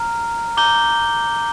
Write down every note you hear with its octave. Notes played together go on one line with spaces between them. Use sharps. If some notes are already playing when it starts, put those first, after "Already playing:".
Already playing: A#5 F6
A#5 D6 G6 G7